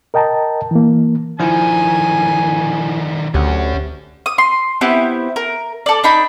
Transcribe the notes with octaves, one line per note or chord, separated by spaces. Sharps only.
A#4 D#5 G5 A5 A#5
E3 A#3
D3 D#3 F3 E4 G#5
D2 C#4 G4 F#5
D#6
C6
B3 C4 E4 G4
A#4
A4 D5
D4 D#4 B5